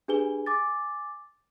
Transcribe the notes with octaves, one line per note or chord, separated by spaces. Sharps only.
D4 G4 G#4 B4 G#5 G7
G#5 D6 A6